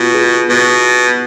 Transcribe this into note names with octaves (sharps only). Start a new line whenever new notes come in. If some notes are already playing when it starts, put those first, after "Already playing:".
Already playing: B2 F4
G#4
B2 B4